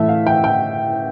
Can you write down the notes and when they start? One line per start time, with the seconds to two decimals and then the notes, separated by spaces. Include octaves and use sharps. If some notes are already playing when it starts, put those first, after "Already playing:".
Already playing: A2 E3 A3 E5
0.09 F5
0.27 G5
0.44 G5